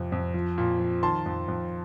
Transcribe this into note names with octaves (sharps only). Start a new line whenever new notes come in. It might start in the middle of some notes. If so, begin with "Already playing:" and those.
Already playing: F2 C3
F2
F3
A#2
F3
D#3 A5 C6
F2
F2